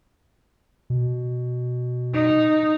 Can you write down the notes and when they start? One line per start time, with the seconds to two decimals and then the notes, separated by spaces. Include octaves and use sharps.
0.90 B2
2.14 D#4